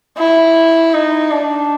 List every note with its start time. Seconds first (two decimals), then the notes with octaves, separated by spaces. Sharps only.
0.18 E4
0.93 D#4
1.31 D4